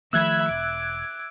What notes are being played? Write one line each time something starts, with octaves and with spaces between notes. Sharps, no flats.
D#3 F3 A3 E5 B5 E6 F#6 G#6
E1 D6